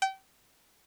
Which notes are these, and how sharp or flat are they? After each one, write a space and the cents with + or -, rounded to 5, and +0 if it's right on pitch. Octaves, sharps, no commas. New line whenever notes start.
G5 -30